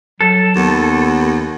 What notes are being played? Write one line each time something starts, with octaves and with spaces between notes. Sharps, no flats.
F#3 A4
D#2 B3